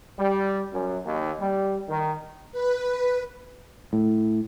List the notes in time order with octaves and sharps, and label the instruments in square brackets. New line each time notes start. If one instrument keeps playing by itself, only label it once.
[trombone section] G3
F#2
D#2
G3
D#3
[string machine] B4
[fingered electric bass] A2